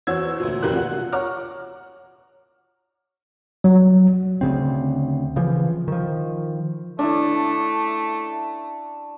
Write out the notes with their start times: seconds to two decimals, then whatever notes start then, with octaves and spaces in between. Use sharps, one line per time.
0.07 E2 F#4 C5 C#5 E6 G#6
0.40 D2 A#2
0.63 F1 B1 E2 G4 A#4 F#6
0.75 F4 F#4 F#5
1.12 C#5 F#5 A#5 D6 F6
3.64 F#3
4.41 D2 C#3 C4
5.36 C#3 E3 F3
5.88 D#3 F3
6.99 A3 D4 E4